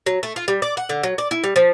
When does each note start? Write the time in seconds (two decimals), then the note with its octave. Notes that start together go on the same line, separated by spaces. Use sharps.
0.06 F#3
0.23 A3
0.36 F4
0.48 G3
0.62 D5
0.77 F#5
0.89 D3
1.03 F#3
1.18 D5
1.31 E4
1.44 G3
1.56 F3